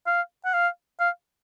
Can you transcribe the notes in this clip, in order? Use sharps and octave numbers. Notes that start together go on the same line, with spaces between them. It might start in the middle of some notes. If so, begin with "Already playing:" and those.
F5
F#5
F5
F5